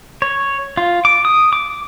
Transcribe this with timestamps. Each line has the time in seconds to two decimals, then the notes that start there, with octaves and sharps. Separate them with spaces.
0.22 C#5
0.77 F4
1.05 D6
1.25 D#6
1.53 D6